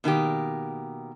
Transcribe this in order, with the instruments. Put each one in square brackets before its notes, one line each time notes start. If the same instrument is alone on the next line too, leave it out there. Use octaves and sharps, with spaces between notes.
[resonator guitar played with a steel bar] B2 D#3 A#3 G4